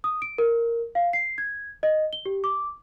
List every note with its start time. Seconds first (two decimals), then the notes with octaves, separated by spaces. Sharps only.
0.04 D#6
0.22 D7
0.38 A#4
0.95 F5
1.13 C7
1.38 G#6
1.83 D#5
2.13 G7
2.26 G4
2.44 D6